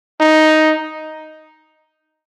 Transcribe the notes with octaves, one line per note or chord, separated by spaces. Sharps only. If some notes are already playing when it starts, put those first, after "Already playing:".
D#4